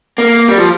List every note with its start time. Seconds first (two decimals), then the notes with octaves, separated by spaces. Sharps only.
0.18 A#3
0.48 G3
0.58 F3